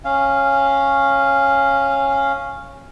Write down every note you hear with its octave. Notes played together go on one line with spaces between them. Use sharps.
C#4 F5